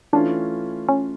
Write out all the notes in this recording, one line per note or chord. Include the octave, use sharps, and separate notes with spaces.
E3 A3 C#4 D4 F4
C#4